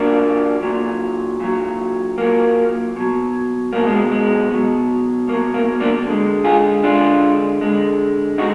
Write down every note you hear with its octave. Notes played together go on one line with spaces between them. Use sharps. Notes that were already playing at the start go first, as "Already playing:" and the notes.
Already playing: A#2 F#3 A#3 D4
A#2 F#3
A#2 F#3
A#2 F#3 A#3
B2 F#3
B2 F#3 A#3
G#3
G#3
B2 F#3
B2 F#3 A#3
A#3
A#3 D4
D3 G#3
F4 G#4
D3 G#3 D4 F4
D3 G#3
D3 G#3 D#4 F#4